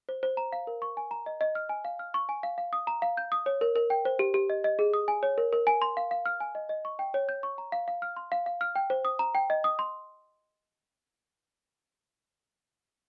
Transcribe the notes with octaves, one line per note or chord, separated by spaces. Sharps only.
C5
C5
A#5
F5
A#4
C#6
G#5
A#5
D#5
D#5
F6
G#5
F5
F6
C#6
G#5
F5
F5
D#6
A#5
F5
G6
D#6
C#5
A#4
A#4
G5
C5
G4
G4
D#5
D#5
G#4
D#6
G#5
C#5
A#4
A#4
G#5
C6
F5
F5
F6
G#5
D#5
D#5
C#6
G5
C#5
G6
C#6
A#5
F5
F5
F6
C6
F5
F5
F6
G5
C5
D#6
A#5
G5
D#5
D#6
C6